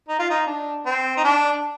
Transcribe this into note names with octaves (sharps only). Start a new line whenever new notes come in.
D#4
F4
D#4
D4
C4
D#4
D4